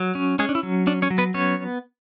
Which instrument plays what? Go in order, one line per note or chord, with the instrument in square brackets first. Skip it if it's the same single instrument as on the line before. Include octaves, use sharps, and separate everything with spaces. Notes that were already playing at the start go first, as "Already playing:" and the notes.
Already playing: [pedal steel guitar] F#3
C#4
G#3 C#4 G#4
D4
E4
F#3
C#4 D4
C#4 C#5
F#3
B3 B4
B3 C#4 C#5